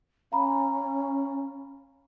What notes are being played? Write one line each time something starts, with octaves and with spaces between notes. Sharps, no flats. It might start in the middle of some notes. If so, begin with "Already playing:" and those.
C#4 F5 A#5 B5